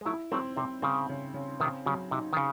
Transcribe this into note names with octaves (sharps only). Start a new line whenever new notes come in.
G#3
F#3 A3 E4
F#3 A3 C4
C3 C4
C#3 C4
C#3
C#3
C3 D#3 C4
C#3 F#3
C3 D#4
D#3
C#3